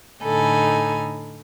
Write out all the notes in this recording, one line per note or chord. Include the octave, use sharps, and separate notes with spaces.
A2 D3 D#4 A4 G#5 B5